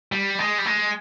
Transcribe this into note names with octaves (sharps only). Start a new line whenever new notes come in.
G3
G#3
G3
G#3